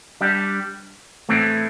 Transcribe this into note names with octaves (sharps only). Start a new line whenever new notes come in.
G3 D4 G4
A2 E3 A3 C4